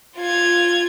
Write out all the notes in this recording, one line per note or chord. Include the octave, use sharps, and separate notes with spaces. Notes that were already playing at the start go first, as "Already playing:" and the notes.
F4 G#6